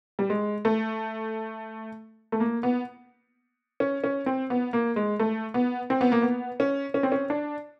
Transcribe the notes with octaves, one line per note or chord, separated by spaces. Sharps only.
G3
G#3
A3
A3
A#3
B3
C#4
C#4
C4
B3
A#3
G#3
A3
B3
C4
B3
A#3
B3
C#4
C#4
C4
C#4
D4